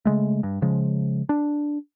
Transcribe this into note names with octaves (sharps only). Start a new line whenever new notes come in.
C#3 G#3 A3
G2
C#3 F3 G#3
D4